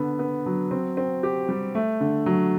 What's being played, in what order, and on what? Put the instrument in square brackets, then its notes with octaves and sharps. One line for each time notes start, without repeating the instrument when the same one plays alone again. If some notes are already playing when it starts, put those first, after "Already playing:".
Already playing: [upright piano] D3 B3
B3
F#3
C4
C4
G4
G3
A3
D3
F#3